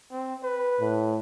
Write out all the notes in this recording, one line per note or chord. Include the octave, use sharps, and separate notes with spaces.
C4
B4
A2